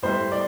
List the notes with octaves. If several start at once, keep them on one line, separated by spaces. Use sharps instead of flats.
A2 G3 C5
D5